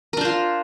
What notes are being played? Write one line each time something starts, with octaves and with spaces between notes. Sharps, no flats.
D4 F4 A#4 C5